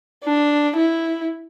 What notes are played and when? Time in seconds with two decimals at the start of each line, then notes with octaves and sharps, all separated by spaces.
0.24 D4
0.77 E4